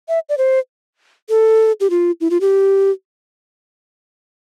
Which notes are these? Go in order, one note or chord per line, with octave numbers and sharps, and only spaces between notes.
E5
D5
C5
A4
G4
F4
E4
F4
G4